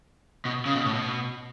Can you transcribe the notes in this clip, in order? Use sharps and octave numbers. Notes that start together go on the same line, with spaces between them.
B2
C#3
B2
A2
B2